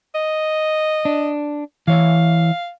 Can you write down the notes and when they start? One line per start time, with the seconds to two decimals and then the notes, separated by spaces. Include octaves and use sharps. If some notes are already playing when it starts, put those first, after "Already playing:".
0.15 D#5
1.05 D4
1.88 E3 C#5 E5 F5